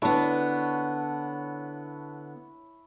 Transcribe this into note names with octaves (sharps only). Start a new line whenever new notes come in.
D3 B3 E4 C#5 A5